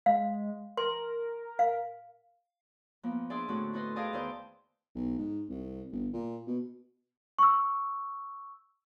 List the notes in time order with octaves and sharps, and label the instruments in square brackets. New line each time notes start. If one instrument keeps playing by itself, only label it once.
[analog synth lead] G#3 [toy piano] F5
[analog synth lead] A#4 [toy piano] C6
[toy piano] F5
[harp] F3 A#3 B3
D4 G#4 D5 E5 C6
A2 D3 A3 C4 F#4
E4 A4 B4 D#5 C6
G#4 D5 D#5 F5 G5 A5
E2 D#3 E4 C5 D5 G6
[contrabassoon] B1
G#2
C2
G1
A#2
B2
[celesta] C#6 E6